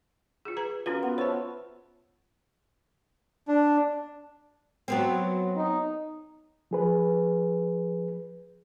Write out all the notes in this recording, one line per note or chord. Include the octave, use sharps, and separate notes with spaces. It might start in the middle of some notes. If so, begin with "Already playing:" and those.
F4 G#4
G#4 B4 A#5
C#4 F4 F#4 A#4 B4
B3
C5 C#5 E5 A5
D4
F#3 B3 C4
D#4
F3 G#4 B4